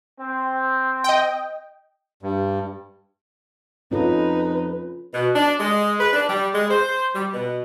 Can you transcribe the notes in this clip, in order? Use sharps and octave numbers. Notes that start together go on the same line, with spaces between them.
C4
D#5 G5
G2
F2 C#4 D#4 F4 A4 B4
B2
D4
G#3
B4
D4
G3
G#3
C5
G3
B2